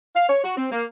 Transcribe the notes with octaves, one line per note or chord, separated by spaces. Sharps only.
F5
C#5
F#4
C4
A#3